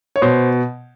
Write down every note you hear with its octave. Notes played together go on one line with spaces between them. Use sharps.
C#5
B2 C5